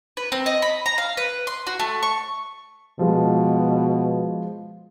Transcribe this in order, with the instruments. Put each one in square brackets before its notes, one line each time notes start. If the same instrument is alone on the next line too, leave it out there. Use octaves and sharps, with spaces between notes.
[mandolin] B4
C4
D#5
B5
A#5
F5
B4
C6
F#4
A3
C#6
[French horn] B2 [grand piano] F3 G#3